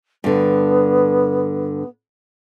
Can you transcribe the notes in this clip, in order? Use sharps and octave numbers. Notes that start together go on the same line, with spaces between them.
G2 D3 B3